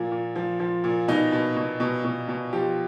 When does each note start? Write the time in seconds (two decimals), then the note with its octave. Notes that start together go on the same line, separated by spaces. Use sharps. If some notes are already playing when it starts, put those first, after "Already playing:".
Already playing: A#2 F3
0.11 A#2
0.35 F3
0.59 F3
0.84 A#2
1.08 B2 D#4
1.32 B2
1.56 B2
1.80 B2
2.04 B2
2.29 B2
2.53 F3 G4